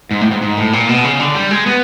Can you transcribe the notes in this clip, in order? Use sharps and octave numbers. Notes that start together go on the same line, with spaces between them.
G#2
A2
G#2
G#2
A2
A#2
B2
C#3
D3
G3
G#3
B3